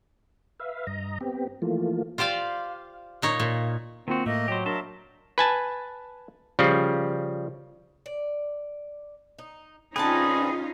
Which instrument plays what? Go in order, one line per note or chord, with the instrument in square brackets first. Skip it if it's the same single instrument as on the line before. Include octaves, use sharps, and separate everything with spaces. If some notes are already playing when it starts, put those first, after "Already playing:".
[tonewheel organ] B4 E5 F5
G2 D#5 A#5
B3 C4 G4
E3 F3 A3 A#3 F4
[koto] F4 G4 C5 D5 F5
A#2 D#4 C#5
A#2
[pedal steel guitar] D#3 F#4 [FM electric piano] A#3 F4 [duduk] C4
[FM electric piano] A2 [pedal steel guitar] A3 [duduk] A#3 [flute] D#5
[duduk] F#3 [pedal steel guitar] G4 C5
[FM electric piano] D4 [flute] A#4 [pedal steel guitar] E5 A5 C6
[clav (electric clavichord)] B4 G#5 A5
C#3 F3 G3
[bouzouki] D5
D#4
[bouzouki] D3 C4 [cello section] C#4 D#4 F4 [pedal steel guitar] G#4 [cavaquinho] B4 A5